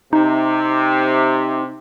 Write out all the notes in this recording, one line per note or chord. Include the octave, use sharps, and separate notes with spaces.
C3 D#4